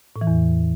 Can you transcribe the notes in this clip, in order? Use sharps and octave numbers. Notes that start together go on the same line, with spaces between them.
A2
E3
E2